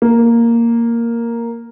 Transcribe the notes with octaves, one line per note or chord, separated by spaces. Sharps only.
A#3